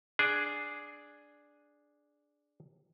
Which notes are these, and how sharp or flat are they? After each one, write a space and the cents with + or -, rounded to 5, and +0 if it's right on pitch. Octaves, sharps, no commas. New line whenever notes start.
D4 +0 G#4 +0